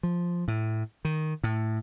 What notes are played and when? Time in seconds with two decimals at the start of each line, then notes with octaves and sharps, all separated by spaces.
0.03 F3
0.48 A2
1.05 D#3
1.44 A2